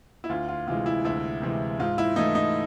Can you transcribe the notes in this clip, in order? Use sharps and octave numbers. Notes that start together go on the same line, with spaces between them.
E4
D2 F4
F4
C3 E3 G#3 F4
E4
D2 E4
C3 E3 G#3
G#2 F4
E4
E3 A3 D#4
D#4